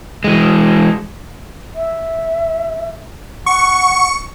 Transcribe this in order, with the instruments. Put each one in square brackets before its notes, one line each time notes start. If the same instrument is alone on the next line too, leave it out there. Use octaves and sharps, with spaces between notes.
[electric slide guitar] E3 G#3
[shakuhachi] E5
[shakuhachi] F#5 [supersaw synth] C#6